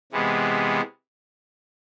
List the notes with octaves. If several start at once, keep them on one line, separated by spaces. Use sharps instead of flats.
C3 E3 G#3 B3